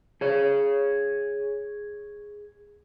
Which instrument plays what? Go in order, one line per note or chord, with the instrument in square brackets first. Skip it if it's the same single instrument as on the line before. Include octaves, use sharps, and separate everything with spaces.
[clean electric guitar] G#4 C#5